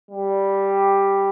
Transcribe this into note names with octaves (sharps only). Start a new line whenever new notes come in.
G3